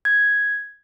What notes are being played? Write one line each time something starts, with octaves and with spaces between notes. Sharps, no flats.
G#6